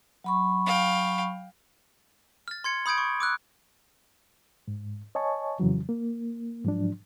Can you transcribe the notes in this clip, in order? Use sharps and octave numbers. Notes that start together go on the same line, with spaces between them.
F#3 B5 C#6
F5 G5
F6 A6
C6 G#6 C#7
B5 D#6 G6 G#6 D7
C#6
D6 E6 F#6
G#2
C#5 D#5 G#5 A5 C#6
F2 C#3 E3 F#3
A#3
G#2 F3 F#3 D4